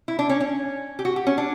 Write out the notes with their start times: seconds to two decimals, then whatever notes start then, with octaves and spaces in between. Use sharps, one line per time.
0.08 E4
0.19 D4
0.29 C#4
0.40 C#4
0.99 G4
1.05 F#4
1.16 G4
1.27 C#4
1.38 D4